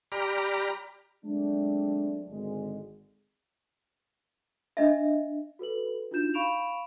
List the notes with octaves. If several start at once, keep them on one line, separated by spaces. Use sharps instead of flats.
G4 D5 A#5 B5 F6
F#3 G#3 A3 C4 D4
G#1 D3 G#3
D4 D#5 E5
F#4 A4 B4 F#7
D4 D#4 F4 F#4 G6 E7
F5 B5 C#6 D7 E7 F7